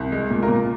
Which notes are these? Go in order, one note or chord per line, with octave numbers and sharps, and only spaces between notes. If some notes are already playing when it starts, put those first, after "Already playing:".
Already playing: C2
G#3
A#2
F4 A#4
A#2